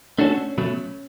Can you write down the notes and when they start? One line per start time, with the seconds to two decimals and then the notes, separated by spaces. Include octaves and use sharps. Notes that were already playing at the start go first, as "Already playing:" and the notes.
0.18 A3 C#4 D4 F#4 A4
0.58 B2 F#3 A3